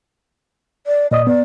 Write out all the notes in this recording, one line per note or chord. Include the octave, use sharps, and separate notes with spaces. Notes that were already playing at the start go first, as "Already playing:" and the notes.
D5
A#2 D5 D#5 D#6
B3 D5